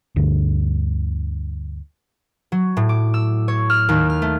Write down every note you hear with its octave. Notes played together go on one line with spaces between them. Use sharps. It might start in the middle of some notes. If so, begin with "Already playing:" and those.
D2 G2 D3
F#3
A2
D6
E6
C#5
F6
D#2
F6
A3